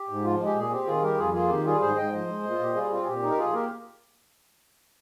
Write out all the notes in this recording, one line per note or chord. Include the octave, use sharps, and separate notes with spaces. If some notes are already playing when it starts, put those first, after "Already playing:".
Already playing: G4
G#2
F3 F4
G#3
G4
A#2 G#4
C4 G4
D#3 F4 G#4
G3 G4 A#4
F2 F4 G#4
A#3 F4 G#4
D#3 G4
G3 F4 G#4
G#2 G#4 C5
G#2 D#5 G5
F3 C5 D#5
G#3
A#2
F4
A#2 G4
G3 F4 G#4
C4 F4
G#4
A#2 G4
D#4
A#4
F3 F4 G#4
A#3 G4 A#4